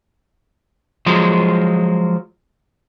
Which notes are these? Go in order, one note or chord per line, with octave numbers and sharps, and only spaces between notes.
F3 F#3 G#3